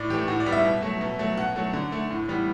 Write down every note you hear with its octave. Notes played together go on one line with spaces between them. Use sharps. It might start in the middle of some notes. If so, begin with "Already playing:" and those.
Already playing: A2 D5
E3 A3 G4
A2 F#4
D5
G3 B3
E5
B2
F#3 A3
B2
F#3 A3
B2 F#5
F#3 A3
D3
A3
A2
E3 G3 B3